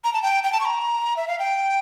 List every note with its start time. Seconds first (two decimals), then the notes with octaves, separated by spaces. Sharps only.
0.04 A#5
0.13 A5
0.22 G5
0.44 G5
0.52 A5
0.61 C#6
0.65 A#5
1.17 E5
1.28 F5
1.39 G5